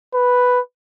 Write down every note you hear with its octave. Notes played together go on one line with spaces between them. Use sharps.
B4